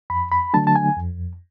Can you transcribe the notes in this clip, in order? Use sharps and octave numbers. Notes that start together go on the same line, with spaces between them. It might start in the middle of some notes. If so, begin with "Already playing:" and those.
F2 B5
B5
D3 F#3 A3 D4 A5
A5
G#5
F2